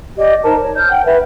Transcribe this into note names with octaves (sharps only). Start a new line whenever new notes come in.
G4 D5 D#5
D#4 A#4 C5 A5
C#5
F6 G6
F#5 G5
B4 E5